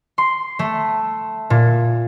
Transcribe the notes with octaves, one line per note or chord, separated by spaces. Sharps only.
C6
A3
A#2